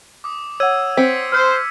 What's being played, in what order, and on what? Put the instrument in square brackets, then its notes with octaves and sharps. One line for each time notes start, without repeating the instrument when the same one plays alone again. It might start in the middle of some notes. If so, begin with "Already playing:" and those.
[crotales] D6 D#6
[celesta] C#5 F#5 [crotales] E6 G#6 D#7
[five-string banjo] C4 [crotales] B6 C#7
[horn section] C5 [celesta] F6